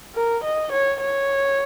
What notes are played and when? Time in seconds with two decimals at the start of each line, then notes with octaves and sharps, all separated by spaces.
0.15 A#4
0.44 D#5
0.73 C#5
1.01 C#5